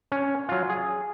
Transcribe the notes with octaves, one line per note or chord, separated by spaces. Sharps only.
C#4
F#3 F4
G#4